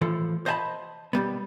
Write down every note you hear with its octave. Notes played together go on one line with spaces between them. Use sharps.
A2 E3 F3 A4
C5 D#5 F5 G#5 A5 B5
B1 F#2 G3 B3